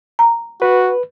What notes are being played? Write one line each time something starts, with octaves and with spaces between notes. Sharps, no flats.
A#5
F#4 B4